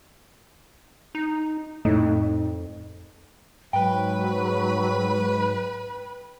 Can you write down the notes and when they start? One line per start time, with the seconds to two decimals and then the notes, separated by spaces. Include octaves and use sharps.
1.15 D#4
1.85 F2 A2 D#4
3.73 G#2 F#3 B4 G5 B5